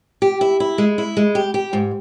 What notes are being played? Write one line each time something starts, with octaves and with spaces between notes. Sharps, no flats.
G4
E4
E4
G#3
E4
G#3
G4
G4
G#2